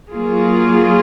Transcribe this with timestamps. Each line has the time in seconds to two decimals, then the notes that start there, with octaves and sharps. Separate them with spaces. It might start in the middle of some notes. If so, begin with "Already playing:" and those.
0.12 F#3 A#3 F4 G#4